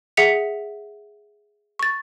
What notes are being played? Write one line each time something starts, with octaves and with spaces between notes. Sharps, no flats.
G#4 E5 F#5 B6 C#7 F7
C#6 A6